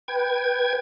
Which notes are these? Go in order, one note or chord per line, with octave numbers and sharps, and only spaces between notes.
B4 G5 G#6